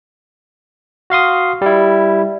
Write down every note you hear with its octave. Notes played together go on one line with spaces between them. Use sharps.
F#4 F5 C6 D#6
G3 E4